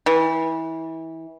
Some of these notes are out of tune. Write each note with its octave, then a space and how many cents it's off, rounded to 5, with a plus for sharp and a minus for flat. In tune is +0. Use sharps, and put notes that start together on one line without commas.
E3 -25